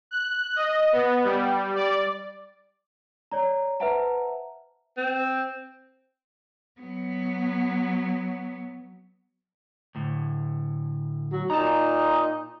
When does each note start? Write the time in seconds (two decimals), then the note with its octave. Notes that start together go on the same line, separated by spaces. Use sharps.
0.11 F#6
0.56 D#5
0.92 B3
1.24 G3
1.75 D5
3.32 C#5 D5 A#5
3.80 B4 C5 E5 F#5 A5 A#5
4.98 C4
6.81 F#3 B3
9.95 D2 A2
11.32 F#3
11.50 A#2 D#4 A5 A#5